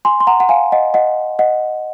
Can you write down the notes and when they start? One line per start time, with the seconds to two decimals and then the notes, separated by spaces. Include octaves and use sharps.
0.05 G#5 C6
0.20 C6
0.27 F#5 A#5
0.40 F#5
0.49 F5 G#5
0.72 D#5 F#5
0.94 D#5 F#5
1.39 D#5 F#5